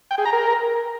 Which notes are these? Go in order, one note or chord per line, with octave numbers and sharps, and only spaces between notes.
G5
G#4
A#5
A#4